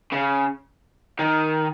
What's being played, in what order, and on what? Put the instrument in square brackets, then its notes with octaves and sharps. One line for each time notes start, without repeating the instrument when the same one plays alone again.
[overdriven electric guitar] C#3
D#3